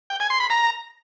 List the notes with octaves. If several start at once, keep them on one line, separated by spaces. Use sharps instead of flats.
G5
G#5
C6
B5
A#5